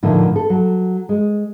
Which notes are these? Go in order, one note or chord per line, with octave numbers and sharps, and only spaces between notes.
A2 D3 D#3 F3
A4
F#3
G#3